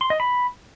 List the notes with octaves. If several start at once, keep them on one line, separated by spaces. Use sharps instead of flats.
C6
D#5
B5